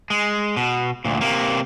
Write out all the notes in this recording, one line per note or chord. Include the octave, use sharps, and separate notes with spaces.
G#3
B2
D2 A#2
C3 A#3